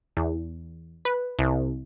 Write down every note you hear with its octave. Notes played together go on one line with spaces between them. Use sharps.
E2
B4
C2